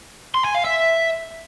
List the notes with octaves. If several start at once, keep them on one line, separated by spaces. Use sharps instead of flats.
C6
G#5
F5
E5